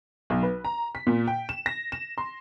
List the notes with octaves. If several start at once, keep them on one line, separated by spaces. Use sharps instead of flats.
B1
B4
A#5
B6
A#2
G5
E7
A#6
E7
C6